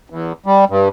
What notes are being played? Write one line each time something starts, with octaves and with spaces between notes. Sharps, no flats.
E2
G3
G2